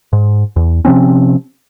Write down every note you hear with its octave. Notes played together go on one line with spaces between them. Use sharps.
G#2
E2
C3 F3 C4 C#4